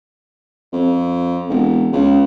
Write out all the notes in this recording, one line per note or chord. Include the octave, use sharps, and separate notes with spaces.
F2
E1
C#2